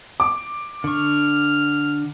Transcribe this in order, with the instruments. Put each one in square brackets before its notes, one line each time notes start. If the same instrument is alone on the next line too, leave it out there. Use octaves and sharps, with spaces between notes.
[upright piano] D6
[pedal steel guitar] D3 C#6 [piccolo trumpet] F6